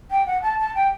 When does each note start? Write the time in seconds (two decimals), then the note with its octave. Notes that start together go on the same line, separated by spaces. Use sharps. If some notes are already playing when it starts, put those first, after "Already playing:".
0.11 G5
0.26 F#5
0.42 A5
0.59 A5
0.75 G5